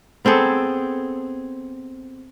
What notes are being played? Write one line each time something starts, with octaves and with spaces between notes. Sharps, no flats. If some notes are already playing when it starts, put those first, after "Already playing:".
B3 C4 G#4 A4